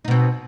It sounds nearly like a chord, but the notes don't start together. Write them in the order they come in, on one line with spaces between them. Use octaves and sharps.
D#4 B2 C4